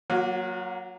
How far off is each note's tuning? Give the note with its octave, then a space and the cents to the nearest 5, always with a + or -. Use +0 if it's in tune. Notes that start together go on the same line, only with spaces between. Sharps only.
F#3 +0 A#3 +5 F#4 -45